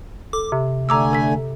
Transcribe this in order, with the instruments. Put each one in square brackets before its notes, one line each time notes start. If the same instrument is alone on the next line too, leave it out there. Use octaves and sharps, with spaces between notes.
[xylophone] A4 [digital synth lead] D6
[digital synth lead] C3
[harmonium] D3 A3 G#5 [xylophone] A#5 D6 E6
[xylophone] A4 B6